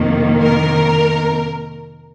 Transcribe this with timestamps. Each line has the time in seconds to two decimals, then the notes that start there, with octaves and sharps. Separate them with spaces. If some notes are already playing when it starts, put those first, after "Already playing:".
Already playing: F2 C3 D#3 A#3
0.41 A#4